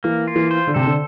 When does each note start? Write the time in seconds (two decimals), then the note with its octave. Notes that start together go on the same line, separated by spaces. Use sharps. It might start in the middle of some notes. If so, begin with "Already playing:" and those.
0.04 E3 A#3
0.28 F4
0.36 E3
0.51 C5
0.67 D3
0.74 C3 A4
0.86 D3